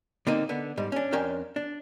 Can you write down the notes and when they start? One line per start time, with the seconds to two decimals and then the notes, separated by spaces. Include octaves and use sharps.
0.27 D3 A#3 C4 D#4
0.49 D3 B3
0.77 G#2 G3
0.92 C#4 D4
1.12 F2 C#4 D4 A#4 G5
1.56 D4